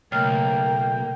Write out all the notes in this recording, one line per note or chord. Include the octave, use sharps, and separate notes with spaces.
B1 C#3 A3 A#3 G5 F6